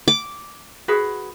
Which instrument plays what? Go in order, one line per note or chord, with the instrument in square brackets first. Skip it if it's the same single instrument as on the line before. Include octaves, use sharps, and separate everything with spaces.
[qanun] D6
[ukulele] F#4 G#4 B4